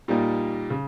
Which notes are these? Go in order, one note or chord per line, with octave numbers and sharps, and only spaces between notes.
A#2 G3 A#3 D#4
C#3